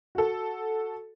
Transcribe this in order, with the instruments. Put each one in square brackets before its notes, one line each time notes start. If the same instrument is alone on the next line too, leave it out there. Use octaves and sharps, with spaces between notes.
[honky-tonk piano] F#4 A4